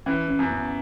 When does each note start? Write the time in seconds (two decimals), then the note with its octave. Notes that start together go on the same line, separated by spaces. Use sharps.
0.06 E3 C#4
0.28 C#4
0.39 F#2
0.51 B3